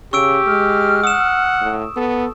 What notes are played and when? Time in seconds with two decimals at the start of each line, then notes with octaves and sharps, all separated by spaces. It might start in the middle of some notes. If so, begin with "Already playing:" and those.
0.13 C#3 G4 C#6 E6 D7
0.47 G#3 F6
1.04 F#5 D#6 E7
1.61 A2
1.96 B3 A4